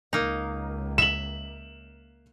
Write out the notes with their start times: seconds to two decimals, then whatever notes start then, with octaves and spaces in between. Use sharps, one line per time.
0.13 C#2 A#3 D#4
0.98 E5 E7 F#7